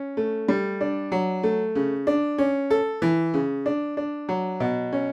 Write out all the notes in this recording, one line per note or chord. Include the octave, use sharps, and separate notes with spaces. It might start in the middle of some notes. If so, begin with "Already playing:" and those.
Already playing: C#4
A3
G3
D4
F#3
A3
C#3
D4
C#4
A4
E3
C#3
D4
D4
F#3
B2
C#4